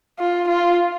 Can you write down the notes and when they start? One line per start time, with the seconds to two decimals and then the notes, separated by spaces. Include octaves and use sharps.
0.19 F4
0.48 F4